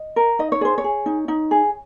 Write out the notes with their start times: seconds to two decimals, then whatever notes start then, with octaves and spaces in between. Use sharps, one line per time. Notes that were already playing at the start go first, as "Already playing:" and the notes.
Already playing: D#5
0.16 A#4
0.39 D#4 D#5
0.52 C#5
0.61 G#4 C5
0.78 C#5
0.84 G#4
1.06 D#4
1.28 D#4
1.51 G#4